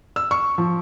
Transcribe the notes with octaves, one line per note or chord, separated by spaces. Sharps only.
E6
C#6
F3